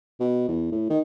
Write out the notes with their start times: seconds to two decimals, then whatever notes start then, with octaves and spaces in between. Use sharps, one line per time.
0.20 B2
0.49 E2
0.72 A2
0.90 D#3